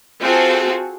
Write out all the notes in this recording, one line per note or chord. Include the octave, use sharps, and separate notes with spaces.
C4 F4 F#4 G#4 A4